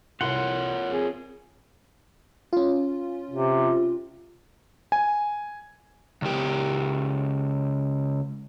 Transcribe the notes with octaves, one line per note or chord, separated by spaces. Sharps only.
C2 F4 A#4 C#5 F#5 C6
C4 G#4
C#4 F4
C3
G#5
C#2 G4